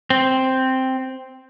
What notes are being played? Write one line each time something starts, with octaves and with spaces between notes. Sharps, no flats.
C4